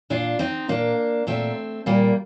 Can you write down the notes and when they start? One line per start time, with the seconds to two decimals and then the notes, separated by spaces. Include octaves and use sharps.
0.10 A#2 D4 F4
0.39 C4 D#4
0.68 A#2 A#3 D4
1.27 A#2 A3 C4
1.86 A#2 G3 A#3